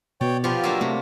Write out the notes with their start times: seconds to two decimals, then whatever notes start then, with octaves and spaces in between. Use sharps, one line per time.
0.21 B2 C#5 D5 G5
0.44 F3 B3 F4 G4
0.64 F#3 A#3 D4 E6
0.81 C3 A3